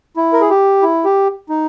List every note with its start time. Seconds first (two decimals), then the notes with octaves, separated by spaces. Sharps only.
0.17 E4
0.33 A#4
0.41 G#4
0.50 G4
0.82 E4
1.05 G4
1.49 D#4